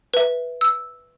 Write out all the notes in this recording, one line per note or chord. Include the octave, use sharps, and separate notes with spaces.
B4 E5
E6